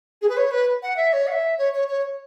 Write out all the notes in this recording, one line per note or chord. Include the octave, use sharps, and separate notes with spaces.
G#4
B4
C#5
B4
F#5
E5
C#5
F#5
E5
C#5
C#5
C#5